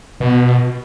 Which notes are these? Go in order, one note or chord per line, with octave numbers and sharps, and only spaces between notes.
B2